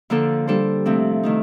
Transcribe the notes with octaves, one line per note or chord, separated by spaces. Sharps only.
D3 F3 A#3 D4 A4
G3 D4 A4 C5
C3 F3 A3 C4
D#3 A3 D#4